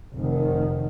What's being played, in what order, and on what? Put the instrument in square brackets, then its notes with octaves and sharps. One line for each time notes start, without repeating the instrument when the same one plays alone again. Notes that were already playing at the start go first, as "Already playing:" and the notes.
[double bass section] F1 D#3